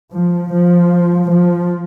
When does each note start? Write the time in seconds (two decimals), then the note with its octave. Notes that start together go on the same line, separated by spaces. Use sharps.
0.13 F3
0.51 F3
1.30 F3